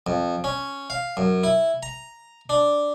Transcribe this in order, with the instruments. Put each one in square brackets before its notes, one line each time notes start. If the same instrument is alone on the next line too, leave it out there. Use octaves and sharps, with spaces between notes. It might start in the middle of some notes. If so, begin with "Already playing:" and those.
[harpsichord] F2
C#4
F5
F#2
E4
A#5
D4